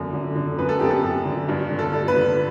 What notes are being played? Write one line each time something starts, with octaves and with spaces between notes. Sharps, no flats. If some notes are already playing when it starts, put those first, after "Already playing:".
Already playing: F#2 D3
D3
D3
F#2 B4
A4
F#2 G4
A4
F#2
D3
G2
D3
A4
G2
B4
D3